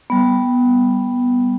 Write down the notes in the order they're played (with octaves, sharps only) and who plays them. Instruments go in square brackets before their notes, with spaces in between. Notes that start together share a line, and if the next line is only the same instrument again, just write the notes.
[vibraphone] G3 B3